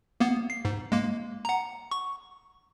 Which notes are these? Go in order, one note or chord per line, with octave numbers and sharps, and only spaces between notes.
A#3 B3
C7
G#2
G#3 A#3
F#5 A#5
C#6